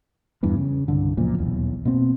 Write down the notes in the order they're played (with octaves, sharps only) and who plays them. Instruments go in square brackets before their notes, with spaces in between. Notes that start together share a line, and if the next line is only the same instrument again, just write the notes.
[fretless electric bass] E2 G2 E3 B3
C#3
C2 G2 D3
C#2 F#2 A#2 F3
D#1 B1 E2
B2 A#3 C4